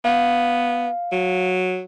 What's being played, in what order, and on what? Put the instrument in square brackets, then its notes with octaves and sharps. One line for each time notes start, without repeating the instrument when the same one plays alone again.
[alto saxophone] B3 [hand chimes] F5
[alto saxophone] F#3